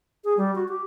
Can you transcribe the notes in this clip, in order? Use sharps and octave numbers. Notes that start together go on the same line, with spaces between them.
G#4
G3
F#4
G4